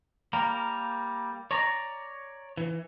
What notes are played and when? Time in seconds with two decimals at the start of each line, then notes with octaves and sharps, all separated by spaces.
0.33 G3 A#3 A#4
1.51 C#5 D5 A#5
2.57 E3